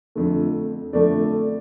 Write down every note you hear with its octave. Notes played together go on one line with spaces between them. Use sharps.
F2 D3 A3
F2 D3 A3 D5